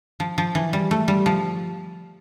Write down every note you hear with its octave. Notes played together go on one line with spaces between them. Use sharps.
F3
F3
E3
G3
A3
G3
F3